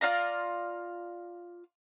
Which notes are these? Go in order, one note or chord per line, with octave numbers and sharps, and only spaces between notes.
F4 D5 F5 A#5